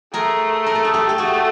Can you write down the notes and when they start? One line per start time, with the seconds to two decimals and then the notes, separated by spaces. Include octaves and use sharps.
0.13 A3 G#4 A#4
0.66 A#4
0.75 A4
0.85 G#4
0.94 G4 A4
1.09 G4
1.18 A3 F#4 G#4